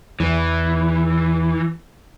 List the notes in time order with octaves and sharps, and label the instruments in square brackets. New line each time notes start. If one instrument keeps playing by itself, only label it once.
[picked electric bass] E2 [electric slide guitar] E3